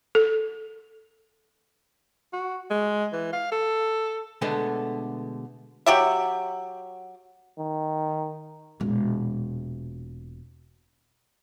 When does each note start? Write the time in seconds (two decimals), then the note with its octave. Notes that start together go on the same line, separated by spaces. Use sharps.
0.15 A4
2.33 F#4
2.70 G#3
3.13 E3
3.33 F5
3.52 A4
4.42 B2 D3 G#3 A3 B3 A4
5.86 F#3 G4 E5
7.58 D#3
8.80 E1 A#2